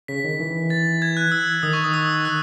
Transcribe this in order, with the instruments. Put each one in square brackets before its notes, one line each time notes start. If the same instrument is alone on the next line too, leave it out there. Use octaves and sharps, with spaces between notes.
[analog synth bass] C#3 [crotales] B6
[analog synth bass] D#3
E3
[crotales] A6
G#6
F#6
E6
[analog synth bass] D#3 [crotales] D#6
[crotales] C#6
D#6
E6
F#6